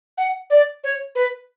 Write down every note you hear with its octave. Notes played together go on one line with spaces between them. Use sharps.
F#5
D5
C#5
B4